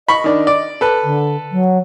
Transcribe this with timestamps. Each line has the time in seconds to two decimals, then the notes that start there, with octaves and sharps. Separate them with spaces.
0.08 D#5 B5 C#6
0.24 D#3 D4
0.47 D5
0.81 A4 B4
1.04 D3
1.52 F#3